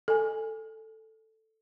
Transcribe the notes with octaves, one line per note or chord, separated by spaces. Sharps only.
A4 G#5